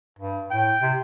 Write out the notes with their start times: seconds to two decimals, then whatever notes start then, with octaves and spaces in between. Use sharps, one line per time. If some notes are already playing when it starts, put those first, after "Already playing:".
0.19 G2
0.50 A2 G5
0.82 C3